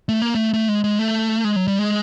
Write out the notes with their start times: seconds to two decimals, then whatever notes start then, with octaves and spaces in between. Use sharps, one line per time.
0.09 A3
0.22 A#3
0.35 A3
0.54 A3
0.69 G#3
0.84 G#3
0.99 A3
1.44 G#3
1.56 F#3
1.68 G3
1.79 G#3